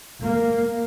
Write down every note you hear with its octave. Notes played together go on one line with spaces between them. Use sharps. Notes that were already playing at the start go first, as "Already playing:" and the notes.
A#3